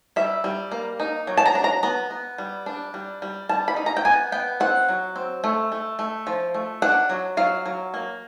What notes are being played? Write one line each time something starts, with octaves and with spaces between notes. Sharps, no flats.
G3 E5
G3
A#3
D#4
F#3
A5
A#5
D4
A#5
B3 A#5
B3
G3
D4
G3
G3
G3 A5
B5
D#4
A#5
G5
B3 G#5
B3 G5
C4 F#5
F#3
C4
A3
A3
A3
F3
A3
D4 F#5
F#3
F#3 F5
F#3
A#3